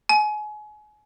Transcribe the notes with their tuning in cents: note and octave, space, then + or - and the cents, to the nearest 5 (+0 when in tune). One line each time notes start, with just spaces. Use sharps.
G#5 +30